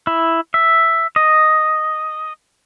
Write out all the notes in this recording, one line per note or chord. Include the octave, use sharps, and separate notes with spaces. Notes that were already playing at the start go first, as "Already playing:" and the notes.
E4
E5
D#5